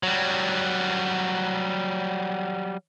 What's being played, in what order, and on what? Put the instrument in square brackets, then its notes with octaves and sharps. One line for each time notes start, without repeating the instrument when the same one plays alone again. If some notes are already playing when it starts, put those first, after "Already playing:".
[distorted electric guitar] F#3 G3